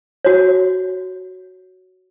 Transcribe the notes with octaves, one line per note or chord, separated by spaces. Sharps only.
F#4 C#5